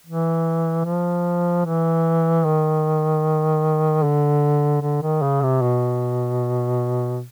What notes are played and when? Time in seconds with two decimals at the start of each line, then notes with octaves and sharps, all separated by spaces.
0.07 E3
0.85 F3
1.65 E3
2.44 D#3
4.03 D3
4.81 D3
5.02 D#3
5.22 C#3
5.42 C3
5.61 B2